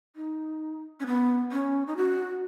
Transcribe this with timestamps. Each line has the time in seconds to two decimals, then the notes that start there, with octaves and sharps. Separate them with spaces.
0.16 D#4
1.00 C#4
1.06 B3
1.52 C#4
1.87 D#4
1.97 F#4